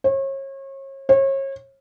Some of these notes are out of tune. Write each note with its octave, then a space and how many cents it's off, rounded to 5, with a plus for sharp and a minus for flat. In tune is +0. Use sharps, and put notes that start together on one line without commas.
C#5 -35
C#5 -35